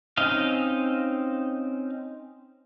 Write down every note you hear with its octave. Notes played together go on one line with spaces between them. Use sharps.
C4 C#4 D#4 D#5 F5